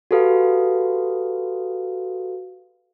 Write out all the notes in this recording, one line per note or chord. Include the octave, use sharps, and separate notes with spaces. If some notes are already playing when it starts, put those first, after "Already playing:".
F#4 G4 A4 B4 F5